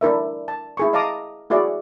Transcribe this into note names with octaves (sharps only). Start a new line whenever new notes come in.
D4 E4 A#4 E5
A5
E4 G#4 C#6
D#5 F5 A5 A#5 D6 D#6
E4 F#4 G#4 D5 E5 F#5